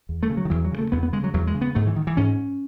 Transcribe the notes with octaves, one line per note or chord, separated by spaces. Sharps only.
E2
A3
C#3
F#3
D#3
E2 E3
F#3
C#3
A3
E2 B3
B3
C#3 G#3
F#3
E2 F#3
G#3
C#3
B3
G#2 A3
E3
D#3
E3
G#2 C#4